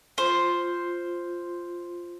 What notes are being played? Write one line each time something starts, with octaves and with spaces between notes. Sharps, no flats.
F4 C5